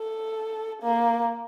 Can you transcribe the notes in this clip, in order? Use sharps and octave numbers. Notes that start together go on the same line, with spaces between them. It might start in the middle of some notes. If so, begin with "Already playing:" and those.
Already playing: A4
A#3